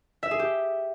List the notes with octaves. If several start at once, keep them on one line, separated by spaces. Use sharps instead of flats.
E5
G#4
G4